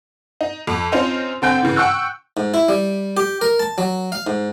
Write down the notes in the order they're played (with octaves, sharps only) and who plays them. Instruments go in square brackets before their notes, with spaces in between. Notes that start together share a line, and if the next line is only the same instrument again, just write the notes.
[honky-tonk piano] D#4
F2
C4 C#4 D#4 F4 C5
D3 C4 G5 G6
C#3 E3
F#5 G5 C#6 E6 F#6
[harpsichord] G#2
E4
G3
G4
A#4
A5
F#3
F5
G#2